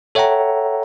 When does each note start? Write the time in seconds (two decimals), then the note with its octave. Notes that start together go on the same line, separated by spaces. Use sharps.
0.15 A4 C#5 E5 F#5 G5 A#5